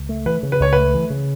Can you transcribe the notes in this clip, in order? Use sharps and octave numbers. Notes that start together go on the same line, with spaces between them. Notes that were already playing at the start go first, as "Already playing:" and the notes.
Already playing: C#2
A3
E3 B4
C#3
B4
C#2 C#5
A3 B4
E3
C#3